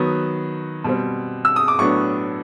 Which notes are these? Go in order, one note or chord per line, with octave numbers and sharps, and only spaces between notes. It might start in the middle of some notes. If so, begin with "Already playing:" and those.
Already playing: D#3 F#3 B3 D#6
B2 G3 C4
E6
D#6
D6
A2 F#3 B3 D4 C#6